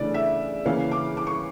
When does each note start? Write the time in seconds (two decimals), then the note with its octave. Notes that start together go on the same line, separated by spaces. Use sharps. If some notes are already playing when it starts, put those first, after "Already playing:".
Already playing: C#3 E3 A3 D4 D5
0.14 E5
0.65 C#3 E3 A#3 C#4 F5
0.91 D6
1.17 D6
1.27 C#6